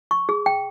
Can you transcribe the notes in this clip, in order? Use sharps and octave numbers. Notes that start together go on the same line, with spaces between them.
C#6
G#4
G5